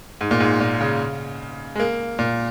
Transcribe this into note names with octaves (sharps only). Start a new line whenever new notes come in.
G#2
A#2
G#2
A#2
C#3
G#3
A#3
A#2